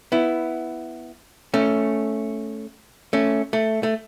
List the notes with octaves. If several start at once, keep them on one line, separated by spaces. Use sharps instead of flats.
B3 E4
A3 C#4
A3 C#4
A3
A3